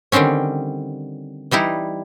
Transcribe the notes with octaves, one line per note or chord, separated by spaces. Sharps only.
D3 D#3 G3 C4 C#4
E3 G3 D#4 E4